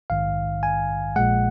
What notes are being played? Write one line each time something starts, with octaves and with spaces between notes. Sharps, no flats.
A#1 G#2 D#3 F5
G#5
A#1 A#2 G#3 F#5